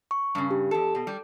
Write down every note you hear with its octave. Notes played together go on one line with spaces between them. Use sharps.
C#6
G2 C#3
G4
E2 A4
B2
G3